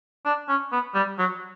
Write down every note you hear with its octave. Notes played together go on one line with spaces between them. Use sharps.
D4
C#4
B3
G3
F#3